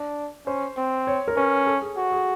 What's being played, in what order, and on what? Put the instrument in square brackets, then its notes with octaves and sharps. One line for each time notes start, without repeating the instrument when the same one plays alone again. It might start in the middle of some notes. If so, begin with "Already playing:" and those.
Already playing: [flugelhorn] D4
[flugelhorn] C#4 [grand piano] C5
[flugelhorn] C4
[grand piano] C#5
A#4
[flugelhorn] C#4 [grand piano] B4
[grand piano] A4
G#4
[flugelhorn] F#4
[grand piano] G#4